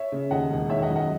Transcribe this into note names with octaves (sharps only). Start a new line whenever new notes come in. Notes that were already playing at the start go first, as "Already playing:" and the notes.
Already playing: C#5 E5
C#3
D#2 D#5 F#5
E1
D#3 C#5 E5
D#5 F#5
F#2
D#5 F#5